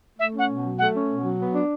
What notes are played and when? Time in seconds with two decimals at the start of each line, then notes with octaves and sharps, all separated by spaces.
0.19 A3 E5
0.33 C#4
0.39 F#5
0.49 B2
0.64 F#3
0.78 A3 F#5
0.94 C#4
1.09 B2
1.24 F#3
1.39 B3
1.54 D4